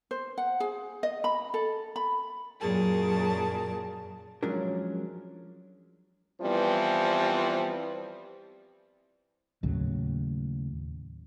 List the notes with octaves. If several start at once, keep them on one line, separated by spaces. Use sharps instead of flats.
C5
F#5
G#4
D#5
B5
A4
B5
F#2 A#2 F#3 G#4 A#4 A5
F3 F#3 G#3 C#4 D4 A#4
E3 F3 G3 B3 C4
D#2 A2 C#3 F#3